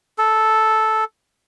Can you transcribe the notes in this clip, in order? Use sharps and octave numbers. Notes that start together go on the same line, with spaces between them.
A4